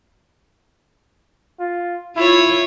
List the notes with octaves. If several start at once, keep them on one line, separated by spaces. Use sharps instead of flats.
F4
E4 F4 C#5